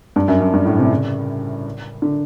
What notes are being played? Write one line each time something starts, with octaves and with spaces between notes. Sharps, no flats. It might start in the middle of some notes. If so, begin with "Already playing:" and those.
G2
F#2
F#2
G2
A2
C3
C#3
D3